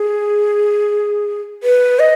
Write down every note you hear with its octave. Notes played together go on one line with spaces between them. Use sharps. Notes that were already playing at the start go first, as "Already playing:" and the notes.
Already playing: G#4
B4
D#5